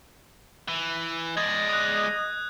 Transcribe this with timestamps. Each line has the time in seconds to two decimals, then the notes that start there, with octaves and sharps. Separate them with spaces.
0.68 E3
1.37 G#3 D5 D#5 G#6
1.69 D#6 F#6